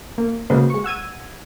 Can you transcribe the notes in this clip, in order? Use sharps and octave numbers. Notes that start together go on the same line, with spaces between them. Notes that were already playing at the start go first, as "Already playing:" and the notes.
A#3
C#3 G#3 A#3 F#4 B4 C5
G#3 C#6
F#5 E6 G#6 D#7